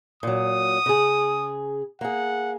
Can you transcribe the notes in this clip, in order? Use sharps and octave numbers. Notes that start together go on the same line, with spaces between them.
A#2 F#3 D#6
C#3 G#4
A#3 G#4 F#5